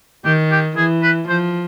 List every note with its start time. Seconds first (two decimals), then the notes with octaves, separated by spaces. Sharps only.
0.25 D#3 G4
0.51 G4
0.77 E3 G#4
1.02 B4
1.29 F3 C5